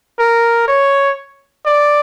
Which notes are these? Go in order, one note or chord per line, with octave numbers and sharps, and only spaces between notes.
A#4
C#5
D5